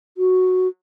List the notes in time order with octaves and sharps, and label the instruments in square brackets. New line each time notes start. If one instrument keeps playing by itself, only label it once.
[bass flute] F#4